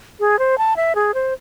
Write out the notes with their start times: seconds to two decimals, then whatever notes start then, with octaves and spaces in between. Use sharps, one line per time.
0.20 G#4
0.39 C5
0.58 A5
0.76 E5
0.95 G#4
1.14 C5